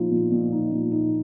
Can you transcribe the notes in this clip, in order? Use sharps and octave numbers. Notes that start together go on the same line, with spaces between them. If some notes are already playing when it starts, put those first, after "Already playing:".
Already playing: A#2 F3 D#4
A#2
A#2
D#4
A#2
D#4